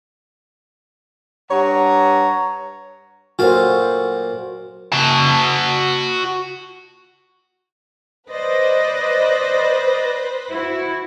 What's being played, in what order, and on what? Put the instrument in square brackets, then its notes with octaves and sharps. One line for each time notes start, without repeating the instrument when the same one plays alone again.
[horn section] G2 C#5 F#5 A#5
[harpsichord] A#2 F#3 F5 [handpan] F#4 A4 C5
[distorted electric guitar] F#4 A5
[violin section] B4 C5 [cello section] D5 D#5
[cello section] E4 F#4